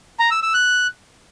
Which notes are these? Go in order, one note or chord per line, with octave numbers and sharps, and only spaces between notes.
A#5
E6
E6
F#6